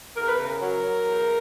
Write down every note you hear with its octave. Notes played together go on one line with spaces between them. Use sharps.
E2 A#4
B4
C#3 A#4
F#3
F#3
E2